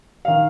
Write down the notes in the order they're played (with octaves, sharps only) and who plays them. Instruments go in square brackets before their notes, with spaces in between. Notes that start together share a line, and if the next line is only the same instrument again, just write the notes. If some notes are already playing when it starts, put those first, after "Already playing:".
[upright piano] D#3 F5